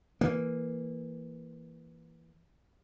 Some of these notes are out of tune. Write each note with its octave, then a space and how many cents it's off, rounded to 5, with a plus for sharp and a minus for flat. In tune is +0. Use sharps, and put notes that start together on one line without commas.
E3 +0 A#3 +0